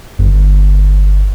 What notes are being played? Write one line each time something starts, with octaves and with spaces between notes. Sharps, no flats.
G1